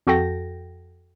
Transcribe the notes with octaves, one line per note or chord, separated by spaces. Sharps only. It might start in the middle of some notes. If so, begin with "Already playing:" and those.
F2 F#4 A4 G5 A#6